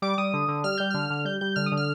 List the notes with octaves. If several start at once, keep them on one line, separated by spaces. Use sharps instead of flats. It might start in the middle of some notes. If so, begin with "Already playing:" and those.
G3 D6
G3 D#6
D3
D3
G3 F6
G3 G6
D3 F6
D3
G3 G6
G3 G6
D3 F6
D#6
D3
F6